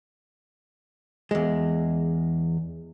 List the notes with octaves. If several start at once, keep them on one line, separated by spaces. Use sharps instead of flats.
E2 G#3